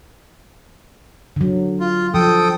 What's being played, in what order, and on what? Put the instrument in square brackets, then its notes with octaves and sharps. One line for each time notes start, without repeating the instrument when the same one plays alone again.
[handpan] D3 F#3
[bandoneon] F4
[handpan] F3 [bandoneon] A4 G5 D#6